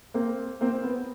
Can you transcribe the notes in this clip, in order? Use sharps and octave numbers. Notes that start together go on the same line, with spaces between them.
A#3 C4
A#3 C4
B3